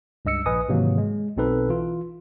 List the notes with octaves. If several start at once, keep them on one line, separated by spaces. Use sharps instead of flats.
C#2 G2 D#5 E6 C#7
A#1 B4 D#5 G#5 D#6
G#2 C3 D#3 E3 F#3 A#3
G#3
B1 B2 C4 D#4 A4 B4
E3 F4